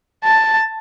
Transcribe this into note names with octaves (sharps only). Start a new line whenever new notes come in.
A5